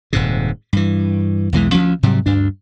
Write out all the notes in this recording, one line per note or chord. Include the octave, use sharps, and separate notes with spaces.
D#1 G#2 C3
G2 E3
B1 E2 E3 G#3
D2 F3 G#3 C#4
G#2 C3 F#3 G3
D2 G2 D4